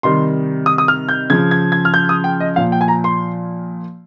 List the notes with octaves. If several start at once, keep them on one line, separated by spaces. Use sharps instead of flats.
C3 D#3 G3 C6
D#6
D#6
F6
G6
C#3 F3 G#6
G#6
G#6
F6
G6
D#6
G5
D#5
A#2 F3 F5
G5
G#5
A#5
C6